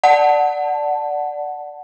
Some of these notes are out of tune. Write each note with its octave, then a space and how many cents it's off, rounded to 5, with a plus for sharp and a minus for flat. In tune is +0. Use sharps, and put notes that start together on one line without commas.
D5 +0 F#5 +0 A5 +0